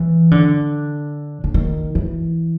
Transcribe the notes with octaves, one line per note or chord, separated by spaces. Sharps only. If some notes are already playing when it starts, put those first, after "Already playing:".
Already playing: E3
D3
D3
D#3
E3